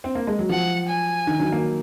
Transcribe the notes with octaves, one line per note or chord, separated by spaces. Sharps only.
C4
A#3
G#3
F#3
F3 F#5
G#5
D#3
D#3 F#3
F#3 A#3